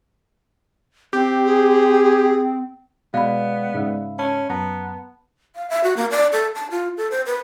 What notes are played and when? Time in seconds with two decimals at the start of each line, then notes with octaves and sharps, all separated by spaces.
1.13 C4 G4
1.45 G#4
3.14 B2 G#3 B3 D5 F5 B5
3.74 G#2 C#3 E5
4.19 C#4 A5 B5
4.50 F#2 B3 A5 A#5
5.56 F5
5.70 E5
5.84 F#4
5.97 A#3
6.11 D5
6.32 A4
6.55 A5
6.71 F4
6.97 A4
7.11 C5
7.26 B4